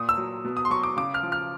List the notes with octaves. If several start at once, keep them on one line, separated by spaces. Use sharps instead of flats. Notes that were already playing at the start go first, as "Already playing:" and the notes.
Already playing: A#2 D#6
E6
F#3
B2
D#6
C6
F#3 C#6
D6
C#3 D6
F6
F3
F6